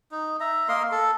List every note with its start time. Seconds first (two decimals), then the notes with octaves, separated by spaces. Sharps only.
0.11 D#4
0.40 E5 A#5
0.68 A#3 A#4 D#5 C6
0.92 A4